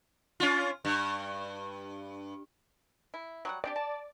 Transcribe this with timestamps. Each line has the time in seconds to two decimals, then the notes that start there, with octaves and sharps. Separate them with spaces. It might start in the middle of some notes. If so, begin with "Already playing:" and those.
0.40 C#4 F4
0.85 G2
3.14 E4
3.45 F#3 G3 F#5
3.64 C4 D4 G4 D5
3.76 A5